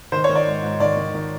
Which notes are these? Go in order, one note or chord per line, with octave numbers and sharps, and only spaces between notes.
D#3 C5
D#3 C#5
D5
G#2
G#2
D#3 D5
D#3
D#3